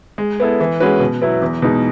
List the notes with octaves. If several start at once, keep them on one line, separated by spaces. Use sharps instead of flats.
G#3
B3 E4 A4
E3
G#3 C#4 F#4 B4
B2
F#3 B3 E4
E2
B2 G#3 D#4